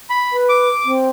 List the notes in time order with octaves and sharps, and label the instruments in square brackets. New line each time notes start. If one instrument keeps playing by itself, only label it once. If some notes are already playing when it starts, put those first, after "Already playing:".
[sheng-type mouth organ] B5
[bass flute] B4
[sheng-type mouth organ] D6
[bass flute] C4